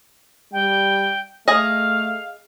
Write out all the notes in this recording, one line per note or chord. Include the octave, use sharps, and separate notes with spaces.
G3 G5
A3 G#4 D#5 F5